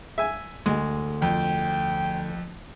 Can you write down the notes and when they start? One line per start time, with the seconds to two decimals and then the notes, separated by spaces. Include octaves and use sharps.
0.18 E5 G#5
0.66 D2 G#3
1.22 F2 G5